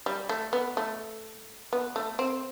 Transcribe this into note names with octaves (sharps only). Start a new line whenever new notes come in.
G3
A3
B3
A3
B3
A3
C4